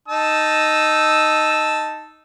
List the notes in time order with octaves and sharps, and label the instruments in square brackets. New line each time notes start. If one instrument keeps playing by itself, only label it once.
[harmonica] D#4 A5 E6